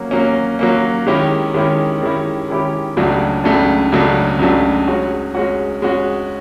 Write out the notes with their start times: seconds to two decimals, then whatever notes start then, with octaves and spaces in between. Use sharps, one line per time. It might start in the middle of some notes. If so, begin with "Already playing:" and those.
Already playing: F#3 A#3 C#4
0.11 F#3 A#3 C#4
0.59 F#3 A#3 C#4
1.07 D#3 G#3 C#4 E4 G4
1.54 D#3 G#3 C#4 E4 G4
2.02 D#3 G#3 C#4 E4 G4
2.49 D#3 G#3 C#4 E4 G4
2.97 C#2 C#3 F#3 A3 D4
3.44 C#2 C#3 F#3 A3 D4
3.92 C#2 C#3 F#3 A3 D4
4.39 C#2 C#3 F#3 A3 D4
4.88 G#3 C#4 F#4
5.35 G#3 C#4 F#4
5.82 G#3 C#4 F#4